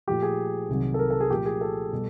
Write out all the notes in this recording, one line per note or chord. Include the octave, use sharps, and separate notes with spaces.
A#2 F3 A3 G4
G#4
C2 C3 D#3 F#3
A4
A#4
A4
G#4
A#2 F3 A3 G4
G#4
A4
B2 G3